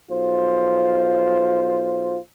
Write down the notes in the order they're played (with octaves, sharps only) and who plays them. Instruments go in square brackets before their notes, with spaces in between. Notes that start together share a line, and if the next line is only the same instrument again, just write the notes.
[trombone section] B1 F4 C5